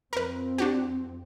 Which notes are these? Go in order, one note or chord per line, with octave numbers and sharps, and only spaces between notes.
F2 C4 A#4 B4
D4 F#4 G4